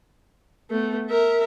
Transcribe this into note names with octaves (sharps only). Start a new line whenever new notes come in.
A3 B3
A#4 E5